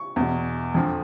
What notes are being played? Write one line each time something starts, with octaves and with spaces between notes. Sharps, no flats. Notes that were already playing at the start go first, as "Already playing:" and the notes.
Already playing: C#6
E2 B2
F2 D3 F3